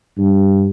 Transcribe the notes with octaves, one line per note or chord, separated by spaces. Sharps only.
G2